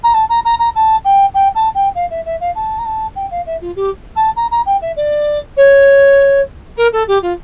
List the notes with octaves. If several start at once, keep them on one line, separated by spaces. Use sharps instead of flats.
A#5
A5
A#5
A#5
A#5
A5
G5
G5
A5
G5
F5
E5
E5
F5
A5
A#5
A5
G5
F5
E5
F4
G4
A5
A#5
A#5
G5
E5
D5
C#5
A#4
A4
G4
F4